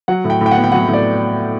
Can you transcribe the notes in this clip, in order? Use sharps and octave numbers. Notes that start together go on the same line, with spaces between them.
F#3 F#5
A2
G5
A2 G5
F#5
B3
G5
F#3 F#5
A2
D5